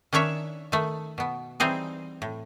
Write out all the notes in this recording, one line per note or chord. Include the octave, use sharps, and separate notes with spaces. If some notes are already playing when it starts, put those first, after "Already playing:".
D#3 C#4 D4 C#5 E5
D#3 A3
B2 B3
E3 G3 C4 D#4 G#4
A2